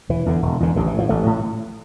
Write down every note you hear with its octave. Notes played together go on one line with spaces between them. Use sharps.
E1 E3
E2 D3
E1
E2 D3
A1 D3
E3
A2 F3
A1 A3
A2